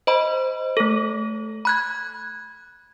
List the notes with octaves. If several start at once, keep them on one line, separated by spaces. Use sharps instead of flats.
C5 D#5 B5
A3 A4
B5 F#6 G#6